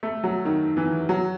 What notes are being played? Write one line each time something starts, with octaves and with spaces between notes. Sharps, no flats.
A3
F#3
D#3
E3
F#3